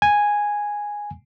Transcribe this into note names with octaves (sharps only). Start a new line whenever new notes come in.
G#5